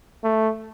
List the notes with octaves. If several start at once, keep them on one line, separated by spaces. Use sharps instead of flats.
A3